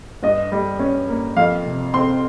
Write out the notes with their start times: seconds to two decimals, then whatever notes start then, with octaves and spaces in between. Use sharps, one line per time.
0.23 G2 D#5
0.52 G3
0.79 C#4
1.08 A#3
1.37 F2 F5
1.66 C3
1.94 C4 C6